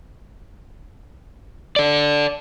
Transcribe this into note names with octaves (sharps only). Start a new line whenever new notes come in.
A4 D5